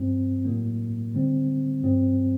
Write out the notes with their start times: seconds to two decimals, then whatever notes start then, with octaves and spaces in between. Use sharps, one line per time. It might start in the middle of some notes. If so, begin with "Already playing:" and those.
Already playing: G2 F#3 C4
0.45 A2 F#3 A#3
1.14 D3 G3 C4
1.83 G2 F#3 C4